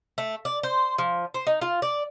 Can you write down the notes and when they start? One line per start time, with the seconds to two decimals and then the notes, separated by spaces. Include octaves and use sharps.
0.18 A3
0.45 D5
0.63 C5
0.98 F3
1.34 C5
1.47 D#4
1.61 F4
1.82 D5